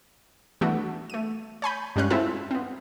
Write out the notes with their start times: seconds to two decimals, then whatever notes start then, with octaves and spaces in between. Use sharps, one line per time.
0.61 E3 G3 A3 B3 D4 F#4
1.10 A3 D#7
1.62 C#5 G#5 B5 G6
1.96 G2 G3 G#3 C#4 F5 F#6
2.10 C4 E4 F4 G#4 A4 E5
2.51 B3 C4